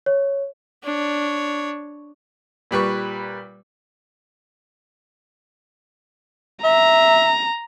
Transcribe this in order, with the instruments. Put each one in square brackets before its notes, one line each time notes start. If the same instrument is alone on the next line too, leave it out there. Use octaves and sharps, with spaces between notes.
[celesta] C#5
[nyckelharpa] D4 C#5
[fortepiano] A#2 G3 B4 C#6
[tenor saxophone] E5 [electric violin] A#5